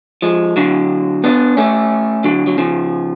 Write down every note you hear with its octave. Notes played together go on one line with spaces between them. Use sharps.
F3 G#3
D3 F#3
B3 D4
A3 C#4
D3 F#3
F#3
C#3 F3